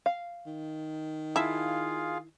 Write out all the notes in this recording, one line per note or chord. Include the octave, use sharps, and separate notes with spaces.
F5
D#3
E4 F4 G#4 E5 F5 A5